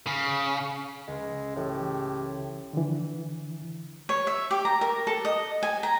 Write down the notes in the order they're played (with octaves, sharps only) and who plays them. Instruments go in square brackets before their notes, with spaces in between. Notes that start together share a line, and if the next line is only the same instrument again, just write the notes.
[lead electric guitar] C#3
[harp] C#2 [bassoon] G#3
[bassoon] A2 [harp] E3 [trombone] G4
[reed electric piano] D3 E3
[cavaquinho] C#5
E5
G4
A#5
A#4
A4
D#5
G#5
A#5